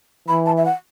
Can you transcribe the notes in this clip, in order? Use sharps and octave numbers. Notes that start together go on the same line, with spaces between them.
E3 B5
A5
E5
F#5